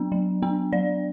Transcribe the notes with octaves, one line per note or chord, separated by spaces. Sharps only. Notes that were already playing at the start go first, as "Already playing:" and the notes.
Already playing: F#3 B3 D4
F#3
B3 D4
F#3 D5